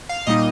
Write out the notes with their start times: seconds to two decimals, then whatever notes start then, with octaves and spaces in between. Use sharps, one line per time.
0.09 F5
0.27 A#2 G3 A#3 D#4 D#5